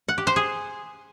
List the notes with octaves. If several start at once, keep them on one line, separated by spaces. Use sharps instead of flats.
F#5
G4
C5
G#4